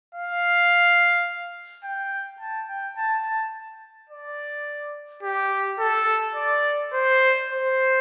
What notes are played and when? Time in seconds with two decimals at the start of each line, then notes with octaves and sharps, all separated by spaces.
0.15 F5
1.84 G5
2.41 A5
2.69 G5
2.97 A5
3.25 A5
4.10 D5
5.23 G4
5.80 A4
6.36 D5
6.93 C5
7.50 C5